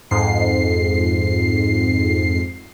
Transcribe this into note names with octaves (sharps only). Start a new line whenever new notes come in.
F2 G#2 C7